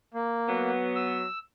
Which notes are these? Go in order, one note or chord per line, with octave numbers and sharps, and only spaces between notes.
A#3
F#3 B3
E6